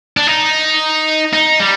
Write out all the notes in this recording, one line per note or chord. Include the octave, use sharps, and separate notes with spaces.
D4
D#4
D#4
G3